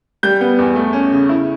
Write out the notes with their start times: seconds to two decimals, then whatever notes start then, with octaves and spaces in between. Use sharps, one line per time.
0.23 G3 G6
0.41 B3
0.59 E2
0.76 A3
0.93 C#4
1.12 C#3
1.29 E4